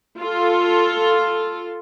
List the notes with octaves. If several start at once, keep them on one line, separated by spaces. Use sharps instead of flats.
F4 A4